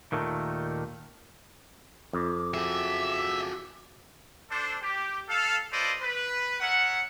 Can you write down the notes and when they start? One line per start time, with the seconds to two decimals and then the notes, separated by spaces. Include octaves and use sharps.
0.12 D#2 A#2 D#3 A3
2.13 F2 D6
2.54 F#4 G#4 E5
4.50 D4 A4 C5
4.81 G4
5.28 A4 F5
5.71 F4 A4 B4 C5 D5 D#5
6.01 B4
6.60 A#4 C#5 E5 F#5